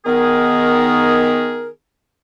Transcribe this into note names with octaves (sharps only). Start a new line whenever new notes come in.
D#3 B3 G#4 A#4